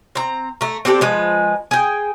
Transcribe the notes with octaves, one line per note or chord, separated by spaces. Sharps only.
C4 A#5
A3 A#5
C4 D4 G4 A4
F3 G#3 B4
G#4 G5